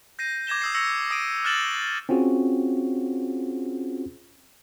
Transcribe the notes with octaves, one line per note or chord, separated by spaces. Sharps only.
G6 A#6 C7 D#7
D6 G#6 A#6 E7 G7
D#6 E6 C7
C#6 E6 A#6 C#7 F7
D#6 A#6 D7 D#7
F6 F#6 A6 E7 F#7 G7
C4 C#4 F4 F#4 G#4